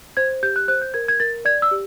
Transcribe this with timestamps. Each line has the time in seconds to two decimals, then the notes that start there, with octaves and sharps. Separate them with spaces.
0.17 C5 G#6
0.43 G4 G6
0.56 F#6
0.68 C5 F#6
0.82 G6
0.94 A#4 G#6
1.08 G#6
1.20 A#4 A6
1.45 D5 G#6
1.62 E6
1.71 G4